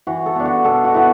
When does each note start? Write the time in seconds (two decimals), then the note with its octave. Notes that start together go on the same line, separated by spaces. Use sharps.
0.07 E3 F#4
0.26 A4
0.35 B3 D4
0.45 F#4
0.65 B2 A4
0.85 F#4
0.94 B3 E4